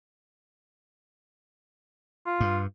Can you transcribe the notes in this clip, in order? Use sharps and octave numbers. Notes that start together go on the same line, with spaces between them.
F4
G2